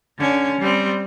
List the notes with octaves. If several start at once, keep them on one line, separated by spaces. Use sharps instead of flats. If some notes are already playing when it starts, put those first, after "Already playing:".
D3 C#4
G3 C4